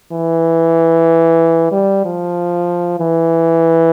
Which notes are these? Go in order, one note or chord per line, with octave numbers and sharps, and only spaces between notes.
E3
G3
F3
E3